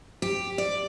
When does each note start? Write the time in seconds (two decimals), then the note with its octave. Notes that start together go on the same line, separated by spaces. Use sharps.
0.22 G4
0.58 D5